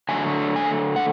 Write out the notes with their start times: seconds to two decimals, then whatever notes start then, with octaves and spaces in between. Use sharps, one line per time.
0.09 D3 F#3 A3 G#5
0.56 G#5
0.96 F#5